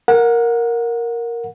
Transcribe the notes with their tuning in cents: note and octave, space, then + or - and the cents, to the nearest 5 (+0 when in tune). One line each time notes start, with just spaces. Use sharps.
A#4 +0 F#5 -25